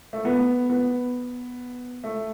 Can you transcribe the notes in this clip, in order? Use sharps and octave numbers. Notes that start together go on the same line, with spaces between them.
A3
B3
B3
A3